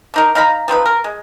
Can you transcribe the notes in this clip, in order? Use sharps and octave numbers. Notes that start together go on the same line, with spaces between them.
D3 D#4 A#4
D#4 F5 A#5 B5
F3 C4 D#4 B4
A#4
G#3